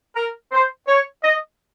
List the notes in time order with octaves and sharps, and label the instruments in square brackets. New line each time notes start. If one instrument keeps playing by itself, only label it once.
[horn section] A#4
C5
C#5
D#5